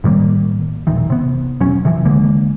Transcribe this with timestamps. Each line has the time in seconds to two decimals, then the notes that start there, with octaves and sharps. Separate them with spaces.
0.04 A2 D#3 G3 A#3
0.87 E1 A#1 D#3 E3
1.10 C3 B3
1.60 E1 B1 F#3 C#4
1.85 C3 E3 F3
2.05 D2 D3 G#3 A#3